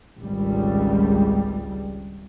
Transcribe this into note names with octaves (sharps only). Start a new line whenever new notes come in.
G#1 C#2 G3